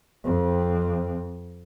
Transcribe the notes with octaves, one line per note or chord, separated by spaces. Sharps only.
F2 C4